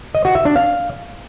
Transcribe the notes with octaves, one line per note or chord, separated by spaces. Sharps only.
D#5
F#4
E5
D4
F5